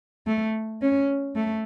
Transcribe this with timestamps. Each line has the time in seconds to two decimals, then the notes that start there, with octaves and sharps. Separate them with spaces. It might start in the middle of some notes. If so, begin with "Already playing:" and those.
0.27 A3
0.82 C#4
1.36 A3